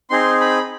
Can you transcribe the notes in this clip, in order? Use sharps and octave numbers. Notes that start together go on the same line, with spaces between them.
C4 D#4 G#4 C6
B5